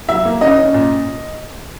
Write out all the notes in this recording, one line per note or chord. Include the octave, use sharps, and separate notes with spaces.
F#3 E5
A#3
C#4 D#5
C#4
A#2